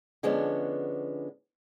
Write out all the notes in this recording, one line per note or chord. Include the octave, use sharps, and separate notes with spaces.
D3 F3 G#3 B3 C#4 D4